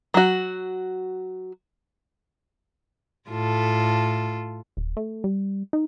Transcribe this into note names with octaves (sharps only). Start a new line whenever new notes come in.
F#3 F#4
A2 F4 A4
D#1
A3
G3
D#4